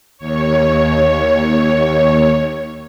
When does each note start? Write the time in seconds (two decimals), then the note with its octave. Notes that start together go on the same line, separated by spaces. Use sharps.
0.18 D#2 C#5